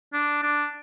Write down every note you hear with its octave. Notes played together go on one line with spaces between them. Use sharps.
D4
D4